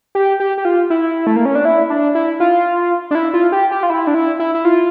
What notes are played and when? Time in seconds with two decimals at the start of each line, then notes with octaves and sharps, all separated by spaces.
0.15 G4
0.40 G4
0.58 G4
0.65 F4
0.90 E4
1.27 A3
1.36 A#3
1.46 C#4
1.55 D4
1.65 E4
1.90 D4
2.15 E4
2.40 F4
3.11 D4
3.15 E4
3.34 F4
3.52 G4
3.71 G4
3.83 F4
3.90 E4
4.07 D4
4.14 E4
4.40 E4
4.55 E4
4.65 F4